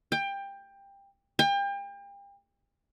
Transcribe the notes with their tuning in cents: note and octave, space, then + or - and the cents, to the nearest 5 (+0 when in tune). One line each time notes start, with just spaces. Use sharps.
G5 +20
G5 +35